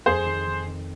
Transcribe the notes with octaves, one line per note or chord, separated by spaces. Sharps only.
F2 G#4 C5
D#3
D#3
D#3